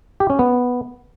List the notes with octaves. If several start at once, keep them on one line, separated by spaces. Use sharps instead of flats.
G4
C#4
B3